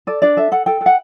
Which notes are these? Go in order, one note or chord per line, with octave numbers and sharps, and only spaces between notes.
A4 D5
D4 D5
A4 E5
A4 F#5
A4 G5
A4
F#5